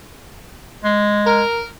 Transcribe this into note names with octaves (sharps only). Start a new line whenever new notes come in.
G#3
A#4